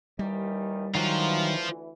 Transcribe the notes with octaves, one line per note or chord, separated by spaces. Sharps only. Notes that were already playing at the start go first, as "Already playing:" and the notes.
D#2 D#3 E3 G3
D2 D#3 E3 F#3 F4 C5